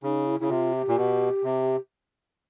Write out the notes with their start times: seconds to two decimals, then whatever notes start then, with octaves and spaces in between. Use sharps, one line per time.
0.03 C#3 D#4
0.26 E4
0.40 C#3 E4
0.50 C3 F4
0.73 G4
0.88 A#2
0.97 B2
1.44 C3